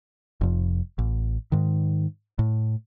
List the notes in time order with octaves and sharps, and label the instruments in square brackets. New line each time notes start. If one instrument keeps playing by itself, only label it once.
[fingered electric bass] F1 F2
A1
G#2 D#3
A2